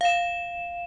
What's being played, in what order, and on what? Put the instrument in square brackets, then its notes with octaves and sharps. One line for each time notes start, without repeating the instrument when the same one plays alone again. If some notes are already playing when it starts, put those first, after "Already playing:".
[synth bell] F5 E7